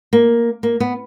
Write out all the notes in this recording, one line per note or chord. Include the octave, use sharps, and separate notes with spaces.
A#3
A#3
B3